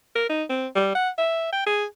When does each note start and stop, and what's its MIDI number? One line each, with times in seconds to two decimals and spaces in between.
0.15 0.25 70
0.29 0.43 63
0.49 0.67 60
0.75 0.93 55
0.95 1.09 78
1.18 1.53 76
1.53 1.66 79
1.66 1.85 68